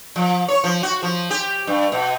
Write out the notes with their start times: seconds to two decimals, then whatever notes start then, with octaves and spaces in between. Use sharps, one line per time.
0.16 F3
0.48 C#5
0.64 F3
0.83 F#4
1.03 F3
1.30 G4
1.67 G2
1.92 B2